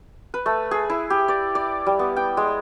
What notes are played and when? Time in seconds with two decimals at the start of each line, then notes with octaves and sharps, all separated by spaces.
0.34 B4
0.46 A3
0.71 G#4
0.90 E4
1.10 G4
1.28 D5
1.55 D5
1.86 G3
1.99 B3
2.16 G5
2.37 G#3